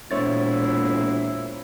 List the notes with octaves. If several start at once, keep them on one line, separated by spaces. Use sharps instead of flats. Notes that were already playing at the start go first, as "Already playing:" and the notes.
E1 A#2 E4 C5 C#5 A6